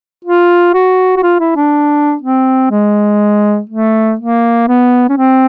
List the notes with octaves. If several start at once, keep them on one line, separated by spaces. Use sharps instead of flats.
F4
F#4
F#4
F4
E4
D4
C4
G#3
A3
A#3
B3
C#4
C4